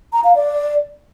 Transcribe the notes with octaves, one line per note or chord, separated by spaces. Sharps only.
A#5
F5
D5